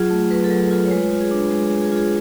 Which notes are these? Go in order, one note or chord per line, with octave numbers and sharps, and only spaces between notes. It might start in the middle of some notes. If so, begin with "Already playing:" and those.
Already playing: F#3 F4 G#4
A3
F#3 B4
A4
F#3
G#4
F4 A4
C#5
G#3 B4
F4
G#4
D4
G#3 G#4
G#4
G#3
G#4
F4 G#4